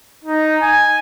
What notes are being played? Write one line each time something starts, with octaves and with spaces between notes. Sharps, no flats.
D#4
G#5